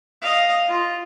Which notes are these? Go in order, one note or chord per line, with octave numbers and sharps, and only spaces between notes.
D#5 F5
F4